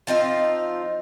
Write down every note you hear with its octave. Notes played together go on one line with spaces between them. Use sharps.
F3 C4 D#4 F4